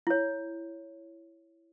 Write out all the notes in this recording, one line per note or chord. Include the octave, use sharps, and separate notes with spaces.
E4 C#5